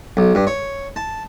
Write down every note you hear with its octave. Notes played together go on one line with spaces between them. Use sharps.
B1
G2
C#5
A5